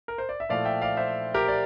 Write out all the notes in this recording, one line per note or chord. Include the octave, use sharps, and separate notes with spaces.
A#4
C5
D5
E5
A#2 F3 A3 E4 D5 F5
E5 G5
D5 F5
C5 E5
G4 A#4
D5